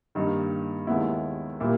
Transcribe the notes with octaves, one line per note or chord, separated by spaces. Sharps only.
G2 D#3 A#3 D#4
D#2 D#3 G#3 B3 E4
A#2 G3 A#3 E4 G4